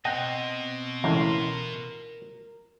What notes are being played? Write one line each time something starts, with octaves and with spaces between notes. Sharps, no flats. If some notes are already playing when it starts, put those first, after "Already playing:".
B2 C4 D#5 F#5 G5
C#2 F#2 A2 E3 A#4 C6